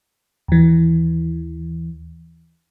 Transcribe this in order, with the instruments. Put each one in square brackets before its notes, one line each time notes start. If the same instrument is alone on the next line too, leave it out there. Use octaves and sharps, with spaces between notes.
[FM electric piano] D#2 E3